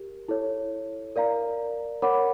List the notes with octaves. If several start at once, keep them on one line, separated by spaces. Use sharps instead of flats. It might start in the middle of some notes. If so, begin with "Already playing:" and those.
Already playing: G4 A#4
E4 A4 C#5
A#4 D5 F5 A#5
A#4 C#5 F#5 B5 D6